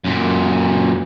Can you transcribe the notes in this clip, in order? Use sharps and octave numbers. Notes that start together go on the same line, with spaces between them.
F#2 A#2